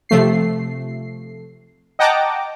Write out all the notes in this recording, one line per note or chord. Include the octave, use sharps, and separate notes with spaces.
C3 F3 A3 C7
D#5 F#5 G5 A5 A#5 D6